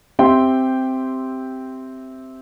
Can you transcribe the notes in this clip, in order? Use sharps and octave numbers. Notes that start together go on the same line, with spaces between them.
C4 G4 E5 G5 C6